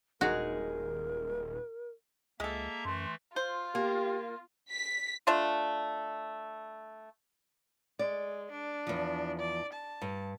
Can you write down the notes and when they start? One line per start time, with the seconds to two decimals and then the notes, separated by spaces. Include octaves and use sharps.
0.21 D#1 G#3 D#4 F#4 G#4 A#4
2.40 C#2 G#3 A#3 A4 E5 A#5
2.85 F#2 E3 A3 C6
3.36 F4 C5
3.75 A#3 G4
4.72 B6
5.27 A3 D4 F4
7.99 G#3 D5
8.51 D4
8.87 E2 F3
9.39 D5
9.73 A5
10.02 G2